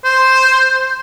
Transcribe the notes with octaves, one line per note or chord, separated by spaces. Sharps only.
C5